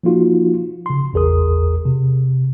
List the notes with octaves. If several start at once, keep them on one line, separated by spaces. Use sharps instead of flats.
F3 A#3 D#4 F4 F#4
C#3 C6
A1 E2 G#4 A#4 D#6
C3